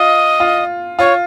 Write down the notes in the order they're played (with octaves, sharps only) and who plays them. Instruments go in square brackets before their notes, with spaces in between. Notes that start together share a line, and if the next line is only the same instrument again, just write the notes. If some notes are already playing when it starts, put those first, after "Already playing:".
Already playing: [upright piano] F4 [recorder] D#5
[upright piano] F4
[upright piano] F4 [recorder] C#5